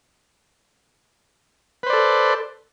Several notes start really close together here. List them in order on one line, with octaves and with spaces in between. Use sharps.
B4 C5 D5 A4